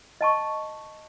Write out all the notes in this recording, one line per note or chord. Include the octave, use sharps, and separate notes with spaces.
D#5 A5 C#6